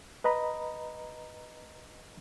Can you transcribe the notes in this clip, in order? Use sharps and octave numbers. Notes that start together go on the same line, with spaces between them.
B4 D#5 A#5 B5